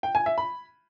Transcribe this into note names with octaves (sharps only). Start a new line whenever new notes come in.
G5
G#5
E5
B5